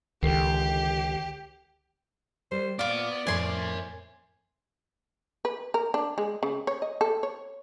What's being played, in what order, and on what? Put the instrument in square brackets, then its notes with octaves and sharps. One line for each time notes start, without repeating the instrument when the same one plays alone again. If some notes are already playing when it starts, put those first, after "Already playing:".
[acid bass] C#2 [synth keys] D3 D#3 C7 [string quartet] G4
[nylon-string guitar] G3 [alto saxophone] C5
[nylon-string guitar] A#2 [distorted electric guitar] B3 [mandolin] F4 D6 [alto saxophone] D5
[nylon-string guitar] F2 A2 [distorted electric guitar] A#4 E5 [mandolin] G#5 C6
[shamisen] B4
A#4
D4
G#3
C#3
C#5
D#5
A4
C#5